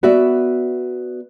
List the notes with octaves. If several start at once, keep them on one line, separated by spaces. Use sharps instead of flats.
B3 F#4 D5 E5